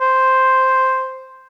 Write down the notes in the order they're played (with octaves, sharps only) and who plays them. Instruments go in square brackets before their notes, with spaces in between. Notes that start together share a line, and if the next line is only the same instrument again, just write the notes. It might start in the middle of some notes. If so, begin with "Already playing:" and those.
[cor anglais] C5